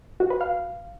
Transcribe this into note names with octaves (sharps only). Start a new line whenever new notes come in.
F#4
B4
F5